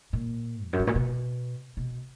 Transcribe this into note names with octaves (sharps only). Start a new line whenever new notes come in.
A#2
E2
F#2
G2
A#2
B2
B2